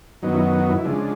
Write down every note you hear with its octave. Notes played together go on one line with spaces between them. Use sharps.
F#2 D#3 F#3 B3 D#4
E4
D#4
D#4
E4
C#3 F3 G#3 D4